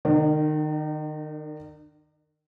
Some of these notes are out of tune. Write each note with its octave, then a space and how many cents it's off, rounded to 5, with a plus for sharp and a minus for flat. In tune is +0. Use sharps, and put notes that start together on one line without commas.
D#3 -30 D4 +35